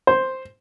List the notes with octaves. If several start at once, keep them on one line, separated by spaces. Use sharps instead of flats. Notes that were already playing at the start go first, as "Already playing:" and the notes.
C5